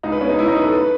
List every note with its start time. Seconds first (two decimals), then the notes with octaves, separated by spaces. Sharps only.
0.03 C#2 D#4
0.12 B4
0.21 B2 C#4
0.29 D#4
0.38 C#2 E4
0.47 D#4
0.56 F#3 B4
0.64 A4
0.73 B4